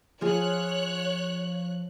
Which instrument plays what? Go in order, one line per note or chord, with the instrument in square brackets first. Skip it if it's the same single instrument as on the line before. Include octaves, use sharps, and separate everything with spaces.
[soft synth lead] F3 [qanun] F4 G#4 [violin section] C#5 F#6